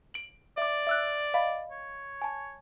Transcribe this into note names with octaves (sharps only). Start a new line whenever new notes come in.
D7 F#7
D5 E5 D6
E5 E6 F#6
D#5 F5 B5
C#5
G#5 A5